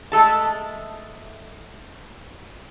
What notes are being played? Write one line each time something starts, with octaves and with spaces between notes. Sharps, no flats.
G#3 A3 A4 A5